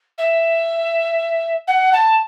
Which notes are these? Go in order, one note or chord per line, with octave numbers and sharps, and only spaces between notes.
E5
F#5
A5